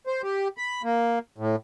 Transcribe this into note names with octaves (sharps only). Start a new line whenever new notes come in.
C5
G4
B5
A#3
A2